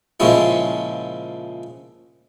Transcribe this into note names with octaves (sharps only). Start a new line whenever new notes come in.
A#2 C#3 F3 G#3 C#4 E4